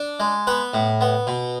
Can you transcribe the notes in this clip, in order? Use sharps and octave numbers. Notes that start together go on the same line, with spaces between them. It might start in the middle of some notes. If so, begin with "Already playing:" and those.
Already playing: D4
G#3
B3 B4
A2
B3
B2